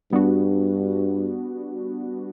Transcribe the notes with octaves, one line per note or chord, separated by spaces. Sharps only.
G2 G3 B3 D4 F#4